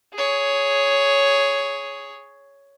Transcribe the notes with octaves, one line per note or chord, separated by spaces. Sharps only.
G#4 C#5